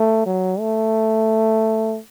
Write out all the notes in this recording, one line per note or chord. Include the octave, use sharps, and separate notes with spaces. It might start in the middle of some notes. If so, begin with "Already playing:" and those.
Already playing: A3
F#3
A3